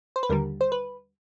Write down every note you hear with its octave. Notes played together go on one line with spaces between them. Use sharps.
C5
B4
D#2 D3 G3 A#4
C5
B4